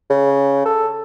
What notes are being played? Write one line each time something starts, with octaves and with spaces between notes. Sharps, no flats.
C#3
A4